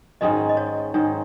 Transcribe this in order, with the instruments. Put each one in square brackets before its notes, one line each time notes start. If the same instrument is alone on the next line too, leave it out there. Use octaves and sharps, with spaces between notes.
[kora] G#2 D#3 G#3 C#4 [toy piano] D#5
[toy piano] D#5
C#5
[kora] G#2 D#3 G#3 [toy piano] C#5